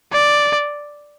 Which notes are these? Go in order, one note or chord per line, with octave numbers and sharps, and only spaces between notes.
D5